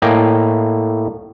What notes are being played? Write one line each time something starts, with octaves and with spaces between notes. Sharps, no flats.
A2 A#3 D#5 G5 G#5 A#5